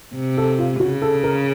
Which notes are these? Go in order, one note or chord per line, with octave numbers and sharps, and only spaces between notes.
C3
A4
F4
C#3 F#4
A4
A#4